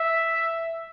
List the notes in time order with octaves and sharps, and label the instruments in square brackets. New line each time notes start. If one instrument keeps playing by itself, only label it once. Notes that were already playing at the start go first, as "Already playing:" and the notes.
Already playing: [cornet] E5